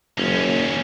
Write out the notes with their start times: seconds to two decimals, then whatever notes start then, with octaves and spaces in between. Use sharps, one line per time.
0.18 F#1 D#2 C#4